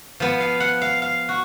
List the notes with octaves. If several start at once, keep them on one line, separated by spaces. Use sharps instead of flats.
F3 B3
F5
F#5
F5
F5
F#4